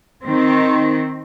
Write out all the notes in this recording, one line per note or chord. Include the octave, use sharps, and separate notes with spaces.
D#3 C4